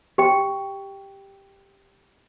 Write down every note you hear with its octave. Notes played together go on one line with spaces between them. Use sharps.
G4 G5